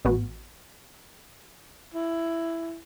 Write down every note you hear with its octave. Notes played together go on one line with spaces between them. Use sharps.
A1 B3 F#4
E4